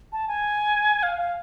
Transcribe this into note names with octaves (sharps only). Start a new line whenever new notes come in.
A5
G#5
F5
F5